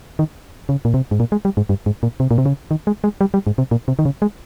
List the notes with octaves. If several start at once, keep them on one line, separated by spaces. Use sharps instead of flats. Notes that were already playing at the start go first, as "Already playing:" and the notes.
D#3
C#3
A#2
C3
G#2
A#2
G#3
G3
G#2
G2
G#2
A#2
C3
A#2
C3
C#3
D#3
G#3
G#3
G3
G3
G#2
C3
A#2
C3
D#3
C#3
G#3